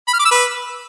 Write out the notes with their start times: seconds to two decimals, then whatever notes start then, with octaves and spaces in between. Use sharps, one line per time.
0.08 B5
0.14 F6
0.20 D6
0.25 E6
0.31 B4